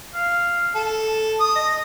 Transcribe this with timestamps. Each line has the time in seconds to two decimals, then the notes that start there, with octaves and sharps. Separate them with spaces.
0.14 F5
0.75 A4
1.40 D#6
1.55 D#5